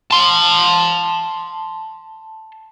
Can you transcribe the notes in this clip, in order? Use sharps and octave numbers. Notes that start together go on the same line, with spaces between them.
A5 C6